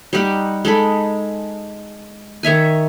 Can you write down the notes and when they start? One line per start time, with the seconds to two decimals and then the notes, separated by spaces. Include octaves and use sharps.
0.13 G3 D#4 G4 F#5
0.65 G#3 D#4 A4 B5
2.43 D#3 C#5 E5 G#5